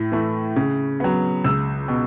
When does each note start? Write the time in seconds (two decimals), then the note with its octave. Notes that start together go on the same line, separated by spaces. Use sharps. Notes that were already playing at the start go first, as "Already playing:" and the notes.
Already playing: A2
0.12 E3 A3
0.56 C#3
1.00 F#3 B3
1.44 C#2 E6
1.88 B2